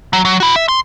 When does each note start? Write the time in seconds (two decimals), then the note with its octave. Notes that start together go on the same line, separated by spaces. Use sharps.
0.13 F#3
0.25 F#3
0.40 E4 F#4
0.56 E5
0.68 C6